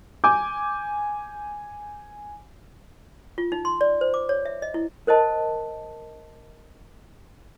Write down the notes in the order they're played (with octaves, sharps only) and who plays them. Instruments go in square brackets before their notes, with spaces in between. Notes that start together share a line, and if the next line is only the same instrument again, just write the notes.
[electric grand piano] G#5 G6 [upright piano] D6
[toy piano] F4
D#4
C6
D5
C5
D6
C#5
E5
D#5
E4
A#4 C5 D#5 A5